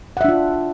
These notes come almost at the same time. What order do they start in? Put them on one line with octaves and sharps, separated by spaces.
F#5 E5 D4 F4